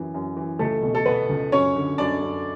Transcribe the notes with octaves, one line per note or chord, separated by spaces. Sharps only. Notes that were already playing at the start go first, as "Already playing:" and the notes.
Already playing: F#2 E3
F#2
E3
C#2 A3 A4
B2
A4
B2 B3 B4
C#2
F#2 C#4 C#5
D3
F#2 D4 D5
F#2